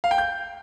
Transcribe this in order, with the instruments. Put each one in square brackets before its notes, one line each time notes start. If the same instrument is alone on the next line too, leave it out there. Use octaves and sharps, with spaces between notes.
[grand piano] F5
G5
G6